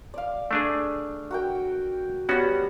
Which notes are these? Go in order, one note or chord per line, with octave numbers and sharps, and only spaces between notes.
D5 F5
A3 D4 G#4
F#4 A#4 G5
G3 B3 C#4 F#4 G4 F#5